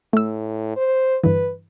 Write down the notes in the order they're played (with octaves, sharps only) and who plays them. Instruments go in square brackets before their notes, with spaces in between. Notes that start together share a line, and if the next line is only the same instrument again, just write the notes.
[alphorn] A2 [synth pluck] A3 E6
[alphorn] C5
[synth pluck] G2 D3 E3 [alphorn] B4